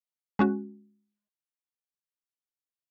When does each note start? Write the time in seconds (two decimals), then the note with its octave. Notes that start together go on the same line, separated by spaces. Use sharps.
0.39 G#3 C#4 F#4